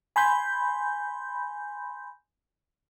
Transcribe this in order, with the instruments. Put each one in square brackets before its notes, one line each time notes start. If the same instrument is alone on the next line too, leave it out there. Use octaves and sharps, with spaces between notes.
[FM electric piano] G#5 B5 C6 G6